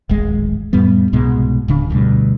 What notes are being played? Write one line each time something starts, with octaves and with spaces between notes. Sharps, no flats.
D1 G#1 G#3
F2 A2 G3 B3
C2 G#2 B2 G#3
D1 C#3 D4
D2 G2 B2